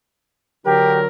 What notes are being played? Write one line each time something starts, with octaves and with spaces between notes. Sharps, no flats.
D3 F#3 G4 A#4